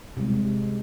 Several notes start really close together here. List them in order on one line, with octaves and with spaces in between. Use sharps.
C3 G3 G#3